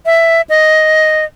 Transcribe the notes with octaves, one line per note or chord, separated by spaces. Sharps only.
E5
D#5